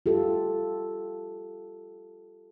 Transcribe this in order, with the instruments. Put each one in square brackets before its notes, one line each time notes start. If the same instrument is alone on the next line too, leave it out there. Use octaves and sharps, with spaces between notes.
[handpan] F4 G4 A4